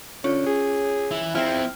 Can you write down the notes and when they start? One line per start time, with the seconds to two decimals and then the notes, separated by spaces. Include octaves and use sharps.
0.24 D3 C#4 F4 C#5
0.46 G#4
1.11 E3
1.35 F3 C4 E4 F6